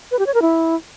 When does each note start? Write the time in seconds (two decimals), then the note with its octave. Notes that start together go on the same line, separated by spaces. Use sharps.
0.11 B4
0.19 G4
0.27 C#5
0.34 A#4
0.42 E4